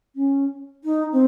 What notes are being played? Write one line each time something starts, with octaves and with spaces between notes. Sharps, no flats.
C#4
D#4
C4